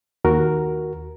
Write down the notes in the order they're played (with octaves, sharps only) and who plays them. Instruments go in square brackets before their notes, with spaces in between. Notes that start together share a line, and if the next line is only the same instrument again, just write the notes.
[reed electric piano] D#2 F#4 A#4